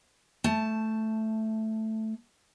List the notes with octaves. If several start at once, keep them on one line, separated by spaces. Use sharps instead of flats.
A3 A5